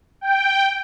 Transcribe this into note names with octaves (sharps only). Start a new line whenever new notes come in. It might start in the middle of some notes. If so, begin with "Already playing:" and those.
G5